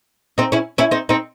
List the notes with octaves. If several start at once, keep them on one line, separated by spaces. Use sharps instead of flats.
C4 D#4
C#4 E4
C#4 E4
C4 D#4
C4 D#4